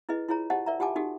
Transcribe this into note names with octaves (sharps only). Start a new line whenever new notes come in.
E4 G#4 B4 D#5
E4 F4 G#4 C#5 A#5
G4 C5 D#5 F#5 A5
A#4 D5 E5 A#5
F4 G4 F#5 G#5 A5 D6
D#4 F#4 G4 A4